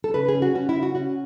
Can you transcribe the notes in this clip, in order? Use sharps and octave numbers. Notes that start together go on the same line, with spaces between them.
A4
C#3 B4
G#4
C#4
F#4
C#4 F#4
E4
C#3
F#4
C#4 F#4